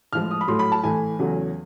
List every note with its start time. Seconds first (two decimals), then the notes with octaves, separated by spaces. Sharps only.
0.13 A2 F3 G#3 F6
0.31 D#6
0.41 B5
0.48 A2 F#3 A3 C6
0.59 B5
0.72 A5
0.83 A2 E3 A3 G#5
1.19 E2 C#3 F#3 A3